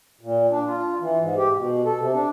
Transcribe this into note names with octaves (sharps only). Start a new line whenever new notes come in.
A#2
D4
F4
E3
G#2
G4
B2
A4
C3
D4